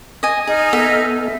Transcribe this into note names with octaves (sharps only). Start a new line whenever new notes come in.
D#5 G#5
D#4 G#4 G#5 F6
B3 A4 E5
E5